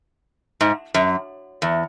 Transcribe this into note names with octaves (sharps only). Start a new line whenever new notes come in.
G#2
F#2
E2